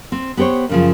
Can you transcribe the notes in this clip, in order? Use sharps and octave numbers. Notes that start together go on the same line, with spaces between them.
C4
B3 G4 A4 C5 C#5
F#2 C#3 F3